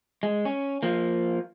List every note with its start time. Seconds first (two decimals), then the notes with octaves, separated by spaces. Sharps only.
0.23 G#3
0.45 C#4
0.83 F3 A#3